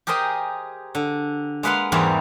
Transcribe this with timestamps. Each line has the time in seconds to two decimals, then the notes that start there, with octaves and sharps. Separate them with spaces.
0.07 G4 G#4 A#4 C5 D#5 G5
0.95 D3
1.63 G#3 A#3 B4 F5 F#5 C6
1.92 E2 G#2 E3 G3 A#3 C4